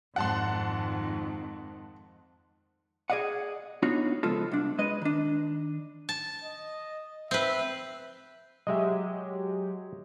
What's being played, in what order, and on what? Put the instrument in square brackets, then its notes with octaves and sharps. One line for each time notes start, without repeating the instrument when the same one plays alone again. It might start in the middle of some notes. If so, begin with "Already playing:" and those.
[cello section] F2 G#2 D#3 [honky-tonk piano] F#5 A5 C6
[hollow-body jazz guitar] G#4 D5 D#5 F5 F#5
B3 D4 D#4 F4 F#4 C#5
C#3 F3 G#3 B3 F4 A4
C2 D4
G#3 B4 D#5
D#3 D4
[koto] A5
[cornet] D#5
[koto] C4 B4 [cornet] E5
[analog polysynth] F#3 G#3 G4 [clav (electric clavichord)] D#5 E5